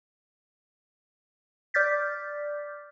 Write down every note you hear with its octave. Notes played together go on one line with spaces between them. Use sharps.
D5 D6 F6 G6 A6 B6